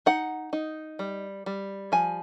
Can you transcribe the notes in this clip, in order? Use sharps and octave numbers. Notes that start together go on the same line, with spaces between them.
D#4 F#5
D#4
G3
G3
F3 G#5